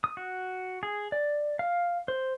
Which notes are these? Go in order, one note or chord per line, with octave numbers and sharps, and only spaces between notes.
D#6
F#4
G#4
D5
F5
C5